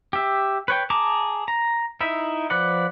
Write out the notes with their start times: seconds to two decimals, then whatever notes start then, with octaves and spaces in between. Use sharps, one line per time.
0.13 G4 E5
0.68 B4 C#5 G5
0.90 G#4 A5 A#5 D6
1.48 A#5
2.01 D#4 E4 E5
2.50 F3 B4 D5 F#5